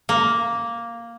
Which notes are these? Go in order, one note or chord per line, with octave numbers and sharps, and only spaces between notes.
A#3